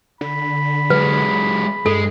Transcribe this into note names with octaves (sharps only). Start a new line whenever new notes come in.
D3 B5
F#3 G#3 B4
G2 G#3 A4